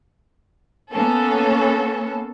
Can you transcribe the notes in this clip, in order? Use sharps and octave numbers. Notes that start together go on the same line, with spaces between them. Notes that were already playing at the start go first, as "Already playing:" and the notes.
A#3 B3 C#4 A4